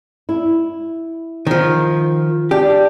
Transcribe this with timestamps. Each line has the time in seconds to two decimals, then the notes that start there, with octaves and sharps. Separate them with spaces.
0.29 E4
1.47 D#3 F3
2.51 D4 G4